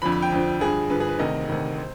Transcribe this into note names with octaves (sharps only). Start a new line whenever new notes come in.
F2 D3 F3 B5
B5
G5
F2 D3 F3
G2 D3 F3 G#4
G2 D3 F3 B4
G#4
B4
D2 C3 D#3 D#5
D2 C3 D#3
C5